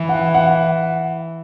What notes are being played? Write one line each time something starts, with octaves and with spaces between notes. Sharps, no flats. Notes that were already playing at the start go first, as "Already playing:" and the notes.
Already playing: E3
F#5
F#5